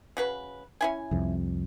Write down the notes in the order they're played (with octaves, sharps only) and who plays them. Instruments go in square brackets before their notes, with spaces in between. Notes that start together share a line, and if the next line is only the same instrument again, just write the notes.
[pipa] C#3 F#4 B4
C#4 E4 G#5
[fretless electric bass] C2 F2